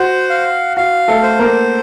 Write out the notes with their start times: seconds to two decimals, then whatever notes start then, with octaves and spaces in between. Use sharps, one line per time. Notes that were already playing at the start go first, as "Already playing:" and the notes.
Already playing: F#4 C5
0.30 F5
0.77 F#4 F5
1.08 A3 A4
1.23 C5
1.39 A#3 A#4